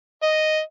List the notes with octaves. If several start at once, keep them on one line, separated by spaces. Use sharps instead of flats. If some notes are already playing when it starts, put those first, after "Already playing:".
D#5